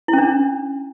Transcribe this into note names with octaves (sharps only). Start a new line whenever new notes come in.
E4
C#4
D4